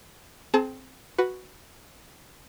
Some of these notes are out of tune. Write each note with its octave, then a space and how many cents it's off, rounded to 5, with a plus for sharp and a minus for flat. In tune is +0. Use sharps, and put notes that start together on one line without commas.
C4 +0 G#4 +40 A5 +15
F#4 +0 B4 +0